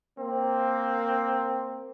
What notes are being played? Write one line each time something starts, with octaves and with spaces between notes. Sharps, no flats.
A#3 C4